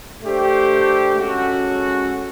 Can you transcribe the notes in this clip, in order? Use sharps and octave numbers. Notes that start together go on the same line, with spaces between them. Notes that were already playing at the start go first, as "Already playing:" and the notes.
A3 D4 G4 C5
G#3 C#4 F#4 A4